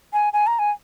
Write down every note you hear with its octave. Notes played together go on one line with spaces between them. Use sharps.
G#5
G#5
A#5
G#5